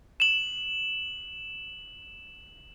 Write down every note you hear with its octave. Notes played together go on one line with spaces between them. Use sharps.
E7 F#7